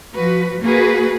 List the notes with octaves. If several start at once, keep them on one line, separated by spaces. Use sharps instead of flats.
F3 F#4 B4
A#3 F#4 G#4 B4